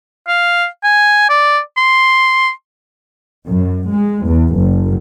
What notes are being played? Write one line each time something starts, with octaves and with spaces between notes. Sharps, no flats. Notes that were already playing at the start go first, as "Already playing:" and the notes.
F5
G#5
D5
C6
F#2
G#3
E2
F#1